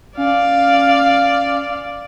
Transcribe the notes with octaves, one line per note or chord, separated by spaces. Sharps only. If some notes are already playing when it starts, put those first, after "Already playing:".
C#4 D5 F5